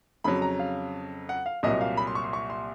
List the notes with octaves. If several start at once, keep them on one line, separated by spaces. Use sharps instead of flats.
F2 C#3 F#3 B5
A#5
F5
F#5
F5
C2 A#2 F#3 D#5
F5
B5
C6
C#6
C6
C#6
C6